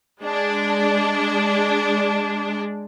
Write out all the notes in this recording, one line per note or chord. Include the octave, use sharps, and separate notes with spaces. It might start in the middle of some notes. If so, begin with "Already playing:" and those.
G#3 D4